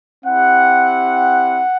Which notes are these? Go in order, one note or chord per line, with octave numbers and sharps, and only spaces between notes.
C4 E4 G4 F#5